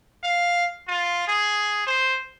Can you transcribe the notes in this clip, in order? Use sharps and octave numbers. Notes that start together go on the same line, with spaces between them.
F5
F4
G#4
C5